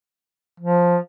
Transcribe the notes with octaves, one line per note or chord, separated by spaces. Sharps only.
F3